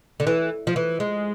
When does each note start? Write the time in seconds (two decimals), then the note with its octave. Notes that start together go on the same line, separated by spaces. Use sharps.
0.20 D3
0.27 E3
0.67 F3
0.76 E3
1.00 G#3